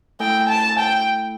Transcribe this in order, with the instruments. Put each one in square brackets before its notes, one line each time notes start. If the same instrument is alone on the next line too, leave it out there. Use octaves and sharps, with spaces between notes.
[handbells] A3 E4 A4 [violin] G5
[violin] A5
G5